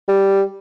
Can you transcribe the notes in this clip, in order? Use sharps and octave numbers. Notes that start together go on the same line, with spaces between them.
G3